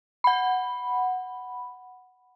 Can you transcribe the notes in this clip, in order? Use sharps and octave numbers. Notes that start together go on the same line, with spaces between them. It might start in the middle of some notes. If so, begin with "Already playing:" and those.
F#5 B5